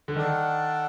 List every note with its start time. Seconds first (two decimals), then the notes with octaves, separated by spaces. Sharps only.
0.08 D3
0.16 D#3 D4 A4 D5 F#5